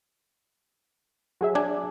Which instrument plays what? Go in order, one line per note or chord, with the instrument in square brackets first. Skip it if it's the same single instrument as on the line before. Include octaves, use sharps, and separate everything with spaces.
[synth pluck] F#3 G#4 E5
[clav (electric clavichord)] D4 G#5